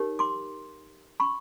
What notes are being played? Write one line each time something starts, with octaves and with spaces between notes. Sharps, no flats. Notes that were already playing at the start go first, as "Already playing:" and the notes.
Already playing: D#4 G4 A#4 C#5
C6 D6
B5 C#6